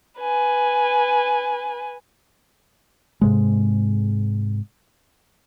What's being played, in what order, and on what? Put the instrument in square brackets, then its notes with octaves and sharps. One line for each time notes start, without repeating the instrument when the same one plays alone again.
[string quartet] B4 G#5
[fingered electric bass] G#2 C3 G#3